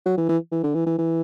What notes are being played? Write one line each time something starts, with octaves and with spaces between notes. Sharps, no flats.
F#3
E3
E3
E3
D3
E3
E3
E3